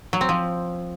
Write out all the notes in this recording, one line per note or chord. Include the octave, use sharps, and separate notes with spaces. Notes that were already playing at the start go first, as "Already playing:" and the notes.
F#3
C4
F3